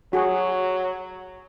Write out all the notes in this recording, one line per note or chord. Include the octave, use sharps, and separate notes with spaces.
F#3 F#4 G#4